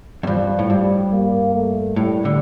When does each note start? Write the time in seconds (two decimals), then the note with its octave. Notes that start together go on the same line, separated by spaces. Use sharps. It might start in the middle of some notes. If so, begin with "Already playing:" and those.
0.23 F2
0.26 G2 F3
0.59 A2
0.69 G2 G3
1.12 A#3
1.54 A3
1.96 A2 G3
2.25 D3